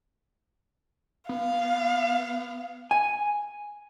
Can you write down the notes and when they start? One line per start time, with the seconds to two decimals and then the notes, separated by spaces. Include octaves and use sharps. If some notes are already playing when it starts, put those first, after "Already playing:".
1.29 B3 F5
2.91 G#5